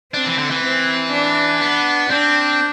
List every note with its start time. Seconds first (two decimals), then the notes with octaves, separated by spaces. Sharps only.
0.14 C4 D4
0.26 E3
0.38 D3
0.51 E3
0.63 C4
1.12 D4
1.61 B3
2.10 C4 D4